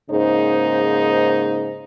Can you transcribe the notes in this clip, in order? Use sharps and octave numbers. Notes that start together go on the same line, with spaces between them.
G#2 C#3 A#3 D#4 G#4 C5